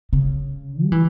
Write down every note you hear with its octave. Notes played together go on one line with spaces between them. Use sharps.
C#3
G3
E3